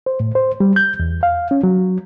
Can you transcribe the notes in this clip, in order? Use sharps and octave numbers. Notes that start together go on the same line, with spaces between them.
C5
A2
C5
G3
G6
E2
F5
C#4
F#3